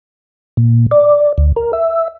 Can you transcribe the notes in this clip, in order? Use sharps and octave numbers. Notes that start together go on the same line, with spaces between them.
A#2
D5
D2
A#4
E5